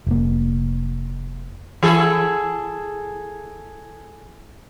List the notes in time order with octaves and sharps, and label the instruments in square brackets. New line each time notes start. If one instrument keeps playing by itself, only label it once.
[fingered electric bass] F1 A#3
[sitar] E3 G#4 A4